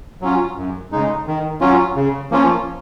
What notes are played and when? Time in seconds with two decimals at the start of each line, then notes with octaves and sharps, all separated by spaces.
0.22 F#3 C#4 F4
0.57 F#2
0.92 C#3 G#3 D#4
1.27 D#3
1.61 F#3 C#4 F4
1.96 C#3
2.31 F3 A#3 C#4 F4